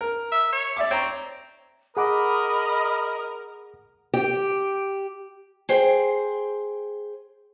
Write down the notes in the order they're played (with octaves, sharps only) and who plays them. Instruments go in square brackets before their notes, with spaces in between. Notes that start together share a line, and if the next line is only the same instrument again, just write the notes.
[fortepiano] A#4
[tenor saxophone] E5
C#5
[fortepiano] D5 E5 D6
[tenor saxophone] C4 [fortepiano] C#5 A#5
[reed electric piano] G#4 F#5 D6 [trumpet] A#4 [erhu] D#5 [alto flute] B5
[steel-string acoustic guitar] G4
G#4 C5 G5